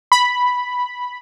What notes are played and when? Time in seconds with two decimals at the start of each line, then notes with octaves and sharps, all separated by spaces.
0.12 B5